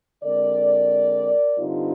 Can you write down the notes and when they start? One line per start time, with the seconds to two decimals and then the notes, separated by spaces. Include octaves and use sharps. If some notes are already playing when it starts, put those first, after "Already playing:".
0.23 D3 G#3 C4 A#4 D5
1.59 G2 D3 G3 C4 D#4 F4